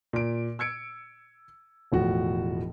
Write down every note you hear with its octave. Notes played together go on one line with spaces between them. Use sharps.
A#2 D7
E6 G#6 C#7 D7
E1 A2 F3 F#4